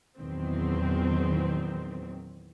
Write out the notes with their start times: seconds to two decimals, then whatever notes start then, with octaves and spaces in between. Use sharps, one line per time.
0.19 E2 A#2 D#3 F#3 C4